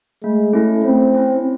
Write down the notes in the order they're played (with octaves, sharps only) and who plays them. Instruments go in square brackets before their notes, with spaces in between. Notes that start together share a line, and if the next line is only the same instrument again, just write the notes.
[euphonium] G#3 [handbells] A3
[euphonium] A3 [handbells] C#4 E4
[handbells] A3 [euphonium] C4
[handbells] C#4 E4